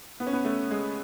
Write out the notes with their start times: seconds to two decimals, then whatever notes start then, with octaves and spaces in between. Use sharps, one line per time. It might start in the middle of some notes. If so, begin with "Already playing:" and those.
0.20 B3
0.27 C#4
0.33 B3
0.45 A3
0.71 G#3